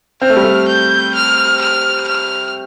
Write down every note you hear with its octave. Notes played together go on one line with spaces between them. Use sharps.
C4 F6
A3
G3
A3
G6
F6
F6
F6